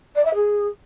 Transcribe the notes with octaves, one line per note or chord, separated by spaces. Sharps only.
D5
E5
G#4